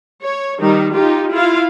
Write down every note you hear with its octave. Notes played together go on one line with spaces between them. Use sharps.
C#5
D#3 G3 D#4
D#4 F4 G4
E4 F4 F5